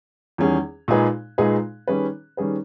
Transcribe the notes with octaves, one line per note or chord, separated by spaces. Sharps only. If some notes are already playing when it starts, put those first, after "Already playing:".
E2 D#3 G3 C#4 G#4
A#2 G#3 D#4 G#4 B4
A#2 G#3 D#4 G#4 B4
D#3 G3 C#4 G#4 B4
D#3 G3 C#4 G#4 B4